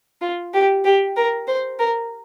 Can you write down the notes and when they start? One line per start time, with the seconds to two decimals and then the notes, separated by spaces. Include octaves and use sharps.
0.21 F4
0.53 G4
0.85 G4
1.16 A#4
1.47 C5
1.78 A#4